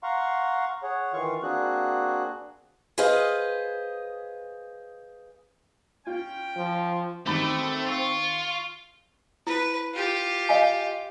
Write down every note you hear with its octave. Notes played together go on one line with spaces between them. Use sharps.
F5 F#5 A#5 C6 C#6
G#4 C#5 F#5
D#3 E3 F4 F5 C#6
A#3 C4 D4 F#4 G#4 F#6
G#4 B4 C5 D#5 F5
C#4 F4 G5
F3
D#3 A3 C4 D#4 F#4 B5 D6 A6
F4 C#6
E4 B4
F4 G4
D#5 F5 G#5